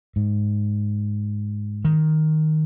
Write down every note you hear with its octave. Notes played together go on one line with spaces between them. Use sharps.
G#2
D#3